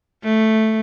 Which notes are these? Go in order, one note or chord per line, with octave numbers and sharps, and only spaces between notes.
A3